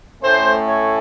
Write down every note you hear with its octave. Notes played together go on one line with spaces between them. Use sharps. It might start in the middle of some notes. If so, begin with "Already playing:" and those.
A2 A3 C#4 C5
C#5